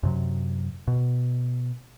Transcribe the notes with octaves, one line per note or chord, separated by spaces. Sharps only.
F#2 C3 F#3
B2